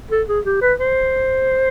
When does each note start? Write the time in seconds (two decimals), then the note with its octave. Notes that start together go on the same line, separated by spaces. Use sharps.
0.11 A4
0.28 G#4
0.45 G4
0.62 B4
0.79 C5